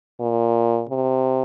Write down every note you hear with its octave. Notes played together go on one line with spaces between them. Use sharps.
A#2
C3